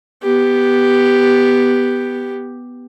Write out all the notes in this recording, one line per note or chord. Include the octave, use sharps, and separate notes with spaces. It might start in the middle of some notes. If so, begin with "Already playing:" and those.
B3 G4